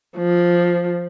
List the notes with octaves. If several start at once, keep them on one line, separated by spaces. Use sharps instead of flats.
F3